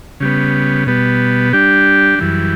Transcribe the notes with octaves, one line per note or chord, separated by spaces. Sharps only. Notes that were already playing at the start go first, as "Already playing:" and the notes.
C#3 G3 B3
B2 G3 B3
G3 D4 G4
F#2 E3 G3